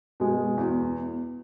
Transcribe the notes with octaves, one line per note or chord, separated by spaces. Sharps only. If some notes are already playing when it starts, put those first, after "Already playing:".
B2 G#3
E2